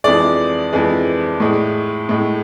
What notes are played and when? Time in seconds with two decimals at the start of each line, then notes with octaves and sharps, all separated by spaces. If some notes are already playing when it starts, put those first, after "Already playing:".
0.04 F2 E3 G#3 D5
0.73 F2 E3 G#3
1.40 A2 G#3
2.09 A2 G#3